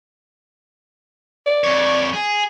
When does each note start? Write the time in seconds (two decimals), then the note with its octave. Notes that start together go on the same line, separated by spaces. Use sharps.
1.46 D5
1.64 F2 C#5
2.13 G#4